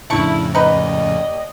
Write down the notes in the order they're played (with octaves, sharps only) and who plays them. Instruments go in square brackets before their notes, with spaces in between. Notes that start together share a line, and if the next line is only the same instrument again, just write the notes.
[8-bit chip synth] F2 A2 C#3 [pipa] A3 D4 C#6 [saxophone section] E4
[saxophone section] D#2 D5 D#5 [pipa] D#4 B4